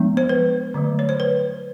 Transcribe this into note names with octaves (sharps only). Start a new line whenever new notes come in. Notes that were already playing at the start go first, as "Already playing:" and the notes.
Already playing: F3 G#3 B3 D4
C5
B4
D3 F#3 A3
C#5
C5
B4